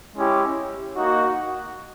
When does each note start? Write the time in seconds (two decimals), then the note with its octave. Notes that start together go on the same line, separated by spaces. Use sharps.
0.16 G#3 C#4 E4 G4
0.95 A#3 D#4 F#4